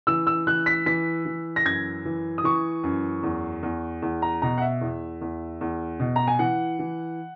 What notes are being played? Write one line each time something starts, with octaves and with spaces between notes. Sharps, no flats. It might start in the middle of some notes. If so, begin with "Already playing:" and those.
E3 E6
E6
E3 F#6
B6
E3 B6
E3
A#6
F#2 G#6
E3
D#6
E3 C#6
F#2
E2
E2
E2
A#5
B2 A#5
F#5
E5
E2
E2
E2
B2
A#5
G#5
E3 F#5
E3